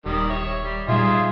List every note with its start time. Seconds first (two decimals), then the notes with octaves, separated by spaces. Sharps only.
0.06 D#1 D#3 G3
0.30 C#5 E5
0.64 G3
0.88 A#2 G3 D#4 F4 G#4 E5